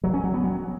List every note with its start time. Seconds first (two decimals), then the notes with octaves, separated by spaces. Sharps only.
0.04 F#3
0.14 C#4
0.24 F#3
0.34 B3
0.44 F#3